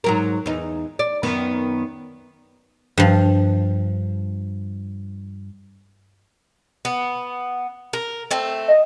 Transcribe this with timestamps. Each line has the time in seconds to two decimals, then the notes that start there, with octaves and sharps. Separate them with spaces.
0.04 G#2 F#3 A#4
0.46 E2 D#4
0.99 D5
1.23 F#2 D#3 B3
2.98 G2 F3
6.85 B3
7.93 A#4
8.31 A3 C4
8.68 D#5